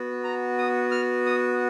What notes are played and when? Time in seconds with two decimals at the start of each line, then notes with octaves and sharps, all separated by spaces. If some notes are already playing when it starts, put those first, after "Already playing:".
Already playing: B3 F#4
0.24 A#5
0.58 D#6
0.91 F6
1.26 D#6